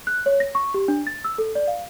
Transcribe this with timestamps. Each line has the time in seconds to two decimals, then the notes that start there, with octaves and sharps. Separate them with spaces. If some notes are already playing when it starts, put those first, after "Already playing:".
0.07 F#6
0.26 C#5
0.40 A#6
0.55 C#6
0.74 G4
0.88 D4
1.07 A6
1.24 E6
1.38 A4
1.55 D5
1.67 F5